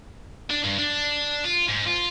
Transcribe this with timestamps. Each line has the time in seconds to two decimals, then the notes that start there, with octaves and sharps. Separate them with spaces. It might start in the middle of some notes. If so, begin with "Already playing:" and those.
0.50 D4
0.64 G2
0.79 D4
1.44 F4
1.68 G#2
1.86 F4